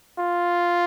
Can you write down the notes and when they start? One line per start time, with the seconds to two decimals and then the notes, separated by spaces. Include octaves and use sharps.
0.19 F4